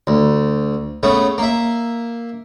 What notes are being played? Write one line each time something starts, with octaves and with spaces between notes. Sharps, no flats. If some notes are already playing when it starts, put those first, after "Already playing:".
D2
C#3 A3 B3
A#3 E5